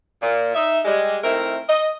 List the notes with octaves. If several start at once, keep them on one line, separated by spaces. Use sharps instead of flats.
A#2
D#4 E5
G3 G#3
D#3 A3 C4 E4 A#4
D#5